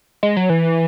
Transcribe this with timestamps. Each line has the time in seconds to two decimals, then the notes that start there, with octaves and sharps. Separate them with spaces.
0.23 G#3
0.37 F#3
0.50 E3